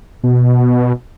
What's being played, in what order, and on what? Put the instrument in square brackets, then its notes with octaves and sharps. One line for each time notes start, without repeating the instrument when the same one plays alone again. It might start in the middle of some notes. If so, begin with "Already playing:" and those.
[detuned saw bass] B2